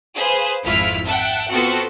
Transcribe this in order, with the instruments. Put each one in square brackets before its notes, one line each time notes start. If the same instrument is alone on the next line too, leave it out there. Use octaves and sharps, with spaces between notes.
[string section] G#4 B4 C5 F5
G#1 F2 E4 F4 F6 B6
E5 F#5 G5 A5
B3 C4 F4 F#4 A4